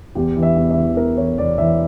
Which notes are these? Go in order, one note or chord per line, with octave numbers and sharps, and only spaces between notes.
E2 G4
E3
E5
E2
E5
E3
E2 A#4
E3 C#5
E2 D5
E3 E5